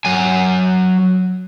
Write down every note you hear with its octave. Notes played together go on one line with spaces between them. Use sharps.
F#3 G#5